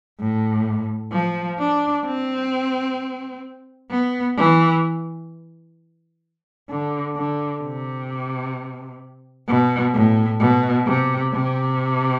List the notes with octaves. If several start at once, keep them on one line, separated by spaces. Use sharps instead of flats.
A2
F3
D4
C4
B3
E3
D3
D3
C3
B2
A2
B2
C3
C3